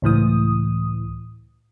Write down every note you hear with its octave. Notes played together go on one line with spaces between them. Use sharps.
C#2 A2 E3 D#6